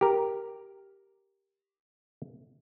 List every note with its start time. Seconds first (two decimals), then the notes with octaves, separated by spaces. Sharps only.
0.01 G4 A#4